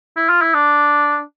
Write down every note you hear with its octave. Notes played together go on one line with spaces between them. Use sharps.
E4
F4
E4
D4